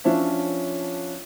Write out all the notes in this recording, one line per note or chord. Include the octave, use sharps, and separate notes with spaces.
F3 C#4 D4 C#5 E5